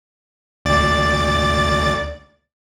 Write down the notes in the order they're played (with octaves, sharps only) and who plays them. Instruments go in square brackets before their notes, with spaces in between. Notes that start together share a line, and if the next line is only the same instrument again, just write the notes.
[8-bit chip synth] D2 D5 A6